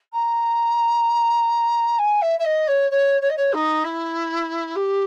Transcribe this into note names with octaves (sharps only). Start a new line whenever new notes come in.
A#5
G#5
E5
E5
D#5
C#5
C#5
C#5
D#5
C#5
D#4
E4
G4